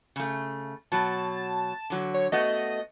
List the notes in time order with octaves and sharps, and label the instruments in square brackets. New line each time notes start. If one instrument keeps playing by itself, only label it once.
[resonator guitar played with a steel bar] C#3 A3
[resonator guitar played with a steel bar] B2 F#3 [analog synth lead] A5
[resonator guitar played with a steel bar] D3 F#3
[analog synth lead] C#5
[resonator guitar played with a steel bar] A3 B3 F#4 [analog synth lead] D#5